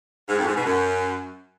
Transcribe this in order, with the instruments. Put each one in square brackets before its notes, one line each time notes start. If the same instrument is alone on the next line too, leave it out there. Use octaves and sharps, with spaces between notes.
[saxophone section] G#2
F2
G#2
B2
F#2